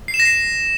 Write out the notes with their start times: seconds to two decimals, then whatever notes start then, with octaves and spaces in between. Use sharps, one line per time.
0.08 C7
0.14 E7
0.20 A#6
0.25 C7